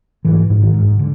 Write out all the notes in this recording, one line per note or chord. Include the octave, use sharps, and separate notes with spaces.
G#2 E3
G#2
D#3
G#2
D3